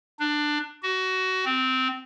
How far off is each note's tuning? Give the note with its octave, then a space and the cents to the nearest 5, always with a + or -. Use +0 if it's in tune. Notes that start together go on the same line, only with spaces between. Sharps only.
D4 +15
F#4 +20
C4 -15